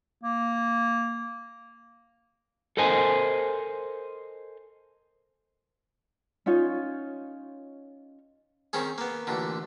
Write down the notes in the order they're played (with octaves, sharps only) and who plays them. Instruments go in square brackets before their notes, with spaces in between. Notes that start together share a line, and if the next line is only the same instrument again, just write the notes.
[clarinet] A#3
[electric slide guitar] A4 A#4 C5 D#5 G#5
[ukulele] C#4 D#4 F4 C#5
[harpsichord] D#3 C4 C#4 G#4
A#3 B3
A1 A#2 D3